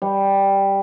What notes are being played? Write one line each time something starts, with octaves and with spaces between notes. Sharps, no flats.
G3